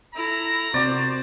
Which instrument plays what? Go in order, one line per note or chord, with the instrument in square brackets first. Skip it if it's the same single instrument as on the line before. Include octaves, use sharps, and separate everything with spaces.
[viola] E4 A4 [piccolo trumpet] A#5
[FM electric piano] C3 C4 [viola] F#4 C5 [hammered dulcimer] D5